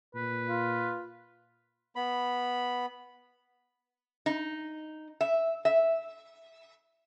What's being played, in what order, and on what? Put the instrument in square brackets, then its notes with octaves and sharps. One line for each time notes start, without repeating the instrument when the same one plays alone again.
[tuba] A#2 [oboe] B4
[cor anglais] F4
[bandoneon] B3 B5
[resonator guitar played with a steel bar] D#4
E5
E5